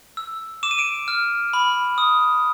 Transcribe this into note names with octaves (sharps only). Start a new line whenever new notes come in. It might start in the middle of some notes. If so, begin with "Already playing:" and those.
E6
D6 E7
D#7
D7 E7
F6
B5
D#6